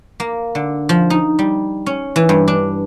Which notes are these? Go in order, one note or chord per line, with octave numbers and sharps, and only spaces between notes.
A#3
D3
F3
D#4
G3
C#4
E3
G2
D4